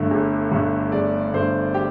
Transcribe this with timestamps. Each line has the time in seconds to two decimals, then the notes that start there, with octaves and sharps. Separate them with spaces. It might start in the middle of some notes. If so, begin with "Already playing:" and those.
Already playing: G1 G2 D3 A3
0.11 G1
0.51 G2 D3 A3
0.92 G1 D5
1.33 G2 D3 A3 C5
1.74 G4